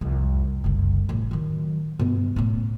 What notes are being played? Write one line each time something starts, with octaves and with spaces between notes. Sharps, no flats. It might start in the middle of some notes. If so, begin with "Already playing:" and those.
C2 F2
F#1 C2
A1
D#3 F#3
G2 B2
A2 C#4